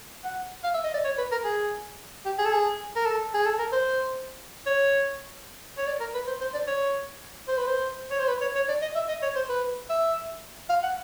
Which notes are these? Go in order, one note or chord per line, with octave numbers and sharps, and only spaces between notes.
F#5
F5
E5
D#5
D5
C#5
B4
A#4
G#4
G4
G#4
A4
G#4
A#4
A4
G#4
A4
A#4
C5
C#5
C#5
D5
A#4
B4
C5
C5
D5
C#5
C5
B4
C5
C#5
C5
B4
C#5
C#5
D5
D#5
E5
D#5
C#5
C5
B4
E5
F5
F#5